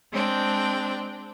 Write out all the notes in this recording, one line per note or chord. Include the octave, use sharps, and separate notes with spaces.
G#3 C4 D4 G5